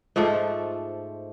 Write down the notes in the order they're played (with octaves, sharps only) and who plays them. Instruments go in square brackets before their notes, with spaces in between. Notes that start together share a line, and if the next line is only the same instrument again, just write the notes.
[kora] G#2 F3 A3